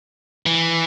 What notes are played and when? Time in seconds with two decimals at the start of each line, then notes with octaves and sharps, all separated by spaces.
0.46 E3